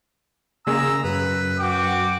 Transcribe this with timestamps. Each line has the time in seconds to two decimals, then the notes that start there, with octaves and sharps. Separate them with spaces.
0.67 C#3 A#3 G#4 A#5 E6
1.04 F#2 B4
1.59 F#4 G5 D6